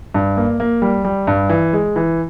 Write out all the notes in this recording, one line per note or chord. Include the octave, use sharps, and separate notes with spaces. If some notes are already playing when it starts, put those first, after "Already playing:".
G2
A#3
A#3
G3
G3
G2
E3
G#3
E3